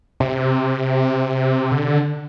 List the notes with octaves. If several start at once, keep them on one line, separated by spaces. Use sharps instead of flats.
C3
D3